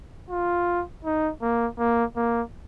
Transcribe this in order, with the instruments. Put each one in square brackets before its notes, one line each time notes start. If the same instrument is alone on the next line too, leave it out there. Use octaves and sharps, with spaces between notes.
[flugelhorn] F4
D#4
A#3
A#3
A#3